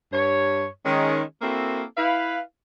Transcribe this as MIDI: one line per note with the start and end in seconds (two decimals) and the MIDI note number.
0.13 0.67 43
0.13 0.67 73
0.85 1.22 51
0.85 1.22 56
0.85 1.22 61
1.42 1.83 58
1.42 1.83 60
1.42 1.83 64
1.42 1.83 66
1.42 1.83 69
1.42 1.83 70
1.97 2.40 64
1.97 2.40 71
1.97 2.40 77